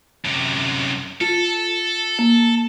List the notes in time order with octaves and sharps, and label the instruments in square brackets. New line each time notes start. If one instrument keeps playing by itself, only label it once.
[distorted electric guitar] F#2 C3
[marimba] F4 [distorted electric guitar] A4
[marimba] A#3